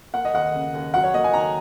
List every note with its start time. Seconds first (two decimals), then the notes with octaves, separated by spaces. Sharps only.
0.13 A#3 F#5
0.25 D#5
0.33 D#2 F#5
0.54 C#3
0.74 D#2
0.94 F#3 F#5
1.03 C#5
1.14 A#3 D#5
1.24 G#5
1.34 D#3 A#5